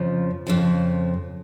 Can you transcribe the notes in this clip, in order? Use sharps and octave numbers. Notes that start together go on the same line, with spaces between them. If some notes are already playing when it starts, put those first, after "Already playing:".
Already playing: F2 C#3 F3
F2 C#3 F3